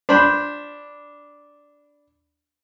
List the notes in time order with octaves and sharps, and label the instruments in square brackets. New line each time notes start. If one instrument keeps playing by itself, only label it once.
[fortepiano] D4 B5 [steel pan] C5